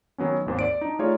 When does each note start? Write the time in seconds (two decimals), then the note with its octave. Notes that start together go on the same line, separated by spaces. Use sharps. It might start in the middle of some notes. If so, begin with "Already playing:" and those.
0.18 D#3 F#3 B3 C#4
0.46 G#1 D#2 C5
0.59 D5 D7
0.81 D4 D#4
0.99 A3 D#4 F4 G#4 C#5 D5